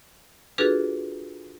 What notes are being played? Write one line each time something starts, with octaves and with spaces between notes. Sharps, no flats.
D4 F4 F#4 G#4 A4 B4